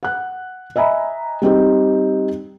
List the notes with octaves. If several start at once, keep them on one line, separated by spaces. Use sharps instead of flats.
F#5 F#6
D#5 E5 G#5 A#5 B5
G3 C4 D#4 G4